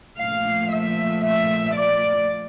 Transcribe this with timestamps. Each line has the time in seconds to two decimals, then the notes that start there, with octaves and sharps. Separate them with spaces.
0.18 A#2 F3 A3 F5
0.70 E5
1.22 E5
1.74 D5